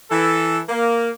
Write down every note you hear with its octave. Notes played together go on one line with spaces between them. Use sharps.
E3 A4
A#3